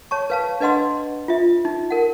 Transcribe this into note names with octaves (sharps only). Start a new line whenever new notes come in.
C#5 A5 C#6
B4 F5 A5
D4 B4 D#5 F#5 C6 E6
F4 E5
D#4
A#4 F#5